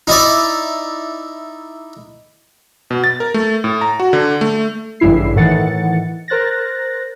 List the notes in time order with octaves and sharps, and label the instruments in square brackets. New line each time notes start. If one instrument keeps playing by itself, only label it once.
[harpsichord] D#4 E4 D5
[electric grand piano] B2
A6
A#4
A3
A2
A#5
F#4
D3
A3
[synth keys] A1 G2 C#3 E4 C7
A2 D#3 E3 F#5 A6 C#7
A#4 C5 F#6 A6 A#6